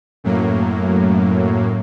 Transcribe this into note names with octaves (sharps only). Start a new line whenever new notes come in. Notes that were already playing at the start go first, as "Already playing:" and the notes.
F#2 A2 F#3 A#3